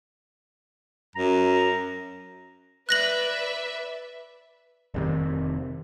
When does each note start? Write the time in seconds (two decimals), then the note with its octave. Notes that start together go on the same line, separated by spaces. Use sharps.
1.16 F#2 A#5
2.89 B4 D5 E5 F#6 A#6 F#7
4.94 F1 C3 D#3